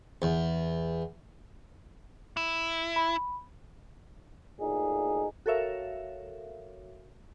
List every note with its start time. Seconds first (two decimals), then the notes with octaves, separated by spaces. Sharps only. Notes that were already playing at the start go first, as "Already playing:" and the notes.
0.22 E2
2.37 E4
2.96 B5
4.59 D2 A#2 D#4 G#4
5.46 F#4 A4 A#4 C#5 E5 F5